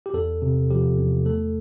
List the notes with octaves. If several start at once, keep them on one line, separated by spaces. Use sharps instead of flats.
G4
E2 A4
C3
F3 G4
E2
A3 A4